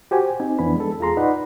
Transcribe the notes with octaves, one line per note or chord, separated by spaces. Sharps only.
F#4 G4 C5 G#5
C4 D#4 G#5
F2 E3 B3 D4 B5
G#3 A4
E2 F4 G#4 A#5 C6
D#4 B4 D5 F#5 B5